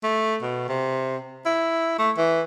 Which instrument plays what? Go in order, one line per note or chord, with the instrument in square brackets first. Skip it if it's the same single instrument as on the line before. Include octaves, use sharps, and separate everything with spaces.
[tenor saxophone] A3
B2
C3
E4
A3
E3